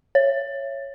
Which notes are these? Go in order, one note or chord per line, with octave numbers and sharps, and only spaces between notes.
C#5